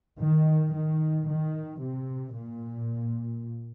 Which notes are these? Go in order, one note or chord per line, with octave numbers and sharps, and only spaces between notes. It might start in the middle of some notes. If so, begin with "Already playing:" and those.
D#3
D#3
D#3
C3
A#2